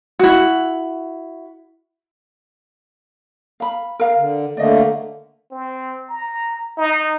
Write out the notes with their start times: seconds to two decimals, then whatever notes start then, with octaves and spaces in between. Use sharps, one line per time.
0.19 E4 F#4
3.60 F5 B5
4.00 A#4 F5
4.17 D3
4.57 D3 A3 A#3 D5 D#5
5.51 C4
6.10 A#5
6.78 D#4